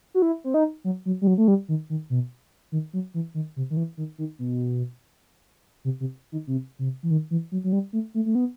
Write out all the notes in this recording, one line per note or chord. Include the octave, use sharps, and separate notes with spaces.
F#4
E4
C4
D#4
F#3
F#3
G3
F#3
A3
G3
D#3
D#3
B2
D#3
F#3
E3
D#3
C3
D#3
E3
D#3
D#3
B2
C3
C3
D#3
C3
C3
E3
D#3
E3
F#3
F#3
G3
A3
A3
A3
B3